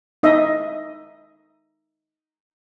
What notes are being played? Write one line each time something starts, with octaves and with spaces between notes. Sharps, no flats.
D#4 D#5 E5